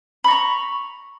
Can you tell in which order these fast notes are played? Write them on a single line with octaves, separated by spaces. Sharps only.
B5 C#6 A#5